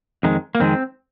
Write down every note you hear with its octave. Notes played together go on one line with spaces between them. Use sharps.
F2 D#3 G#3
A#3
F2 D#3 G#3 C4